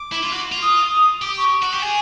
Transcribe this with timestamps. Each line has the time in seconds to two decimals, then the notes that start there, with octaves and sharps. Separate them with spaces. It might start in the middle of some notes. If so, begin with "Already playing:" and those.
Already playing: D6
0.12 E4
0.23 F4
0.33 F#4
0.52 F4
0.62 D#6
1.22 G4 D6
1.37 C#6
1.62 F#4
1.72 G4
1.81 G#4 G#5